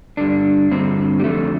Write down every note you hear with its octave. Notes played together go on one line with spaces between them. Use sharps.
G2 D3 D4
G2 D3 C4
G3
F2 D3 A3